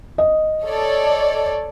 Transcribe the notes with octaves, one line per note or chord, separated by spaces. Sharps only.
D#5
A4 C#5 D5